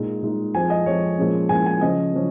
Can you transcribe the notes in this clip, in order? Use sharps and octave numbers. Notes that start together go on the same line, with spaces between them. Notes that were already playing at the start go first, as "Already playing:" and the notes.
Already playing: A#2 G#3 D#4
A#2 G#3 D#4
F2 F3 G#3 G#5
D#5
F2 F3 G#3 C#5
A#2 F3 G#3 C#4
A#2 F3 G#3 C#4 G#5
G#5
C#3 F3 C#4 D#5
C#3 F3 C#4